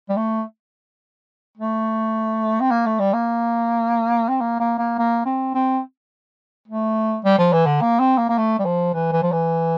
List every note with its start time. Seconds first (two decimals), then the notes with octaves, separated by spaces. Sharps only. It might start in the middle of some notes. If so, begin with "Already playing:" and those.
0.09 G3
0.17 A3
1.58 A3
2.60 C4
2.71 A#3
2.86 A3
2.99 G3
3.13 A#3
4.29 C4
4.41 A#3
4.60 A#3
4.79 A#3
4.98 A#3
5.25 C4
5.54 C4
6.68 A3
7.25 G3
7.38 F3
7.53 E3
7.66 D3
7.81 A#3
7.99 C4
8.18 A#3
8.29 A#3
8.38 A3
8.59 G3
8.65 F3
8.94 E3
9.12 E3
9.22 F3
9.32 E3